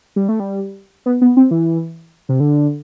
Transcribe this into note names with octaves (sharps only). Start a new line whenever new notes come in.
G3
A3
G3
B3
B3
C4
E3
C3
D3